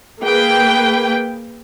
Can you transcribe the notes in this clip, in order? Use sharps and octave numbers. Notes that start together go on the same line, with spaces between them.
A#3 G#4 B4 G5